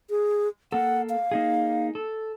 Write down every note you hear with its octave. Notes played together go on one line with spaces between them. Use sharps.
G#4
A#3 A4 F#5
F5
A#3 D#4 G#4
A4